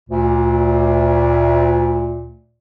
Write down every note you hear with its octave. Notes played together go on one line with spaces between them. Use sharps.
D2 A#2